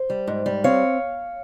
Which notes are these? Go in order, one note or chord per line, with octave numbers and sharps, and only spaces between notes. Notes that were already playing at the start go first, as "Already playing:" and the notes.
Already playing: C5
G3
G#2
G3
C4 C#5 F5